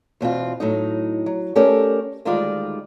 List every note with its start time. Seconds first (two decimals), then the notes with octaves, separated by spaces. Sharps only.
0.21 E2 B2 C4 F4
0.60 A2 F#3 D#4
1.26 F#3
1.55 A3 C#4 G4 A4 A#4 D5
2.25 D2 D#3 G3 G#3 F4 D5